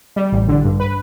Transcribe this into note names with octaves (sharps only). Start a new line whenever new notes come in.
G3
A1
D3
G2
B4